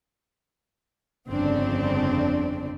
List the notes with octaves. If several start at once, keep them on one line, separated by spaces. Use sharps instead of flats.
G1 F2 C#3 C4 D4